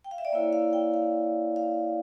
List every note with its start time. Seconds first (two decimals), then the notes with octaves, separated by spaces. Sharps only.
0.04 G5
0.11 F5
0.18 E5
0.25 D5
0.32 A#3 E4 C#5
0.53 F5
0.73 G5
0.94 F5
1.56 F5